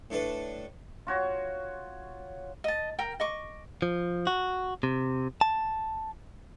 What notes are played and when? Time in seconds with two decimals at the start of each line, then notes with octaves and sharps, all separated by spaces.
0.10 A2 D4 A4 B4
1.07 F4 F#4 C#5
2.64 D#5 A5
2.99 A#4 G5
3.20 D#5 C#6 D6
3.82 F3
4.27 F#4
4.83 C3
5.41 A5